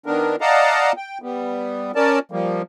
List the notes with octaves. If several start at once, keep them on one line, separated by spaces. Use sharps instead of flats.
D#3 B3 D4 A#4
D5 D#5 F5 F#5 A5 A#5
G5
G3 B3
C#4 A#4 D5 A5
F3 G3 A#3